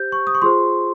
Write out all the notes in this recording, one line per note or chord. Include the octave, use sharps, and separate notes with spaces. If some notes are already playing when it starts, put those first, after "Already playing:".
Already playing: G4 C5 G6
C#6
D#6
C#6
F4 G#4 C5 C6